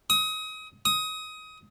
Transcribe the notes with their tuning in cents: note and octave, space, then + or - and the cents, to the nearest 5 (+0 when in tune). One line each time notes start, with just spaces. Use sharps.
D#6 +30
D#6 +20